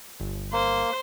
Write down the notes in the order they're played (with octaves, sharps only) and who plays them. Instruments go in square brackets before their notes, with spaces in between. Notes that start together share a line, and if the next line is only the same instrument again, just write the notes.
[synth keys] G1
[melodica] A#3 [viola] C5